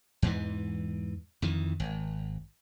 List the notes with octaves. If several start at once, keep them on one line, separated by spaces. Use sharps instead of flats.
E2 G#2 E3
F2 D#3 E3
G#1